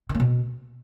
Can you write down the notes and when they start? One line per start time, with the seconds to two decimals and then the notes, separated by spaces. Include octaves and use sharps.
0.09 D#3
0.15 A#3
0.20 B2